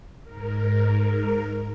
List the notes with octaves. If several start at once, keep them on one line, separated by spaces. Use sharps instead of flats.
G#2 A#4